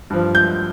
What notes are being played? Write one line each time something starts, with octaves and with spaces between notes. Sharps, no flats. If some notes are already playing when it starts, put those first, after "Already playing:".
G2 F3
G6